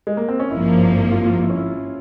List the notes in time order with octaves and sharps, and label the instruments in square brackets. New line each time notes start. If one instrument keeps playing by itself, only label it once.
[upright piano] G#3
A#3
C4
C#4
[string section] G#1 G2 F3 A#3 [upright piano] E4
[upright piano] F4
F4
E4
C#4
E4